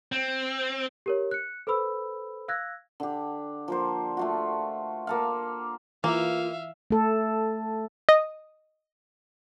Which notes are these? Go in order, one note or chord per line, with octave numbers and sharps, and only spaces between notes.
C4
G4 A#4 C#5
F#6 C#7
A4 B4 C5 B5 E6
F5 E6 F#6 G#6 A#6
D3 G4
F3 A#3 C5
A3 F4 F#4
A#3 A4 F5
E3 A#3 F4 E5 F5
A3 A4
D#5